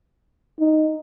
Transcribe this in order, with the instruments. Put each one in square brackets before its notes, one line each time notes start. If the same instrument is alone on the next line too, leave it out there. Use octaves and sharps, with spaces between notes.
[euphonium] D#4